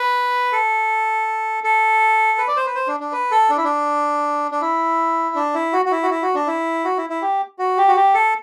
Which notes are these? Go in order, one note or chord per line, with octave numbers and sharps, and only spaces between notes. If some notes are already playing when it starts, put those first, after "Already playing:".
Already playing: B4
A4
A4
B4
D5
C5
B4
C5
D4
D4
B4
A4
D4
E4
D4
D4
E4
D4
E4
F#4
F#4
E4
F#4
E4
F#4
D4
E4
F#4
E4
E4
G4
F#4
G4
F#4
G4
A4